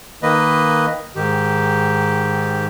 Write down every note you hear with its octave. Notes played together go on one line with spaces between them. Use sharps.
D#3 A#3 B4 D#5
G#2 D#3 G4